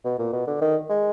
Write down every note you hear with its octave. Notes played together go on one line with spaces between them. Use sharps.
B2
A#2
B2
D3
D#3
G#3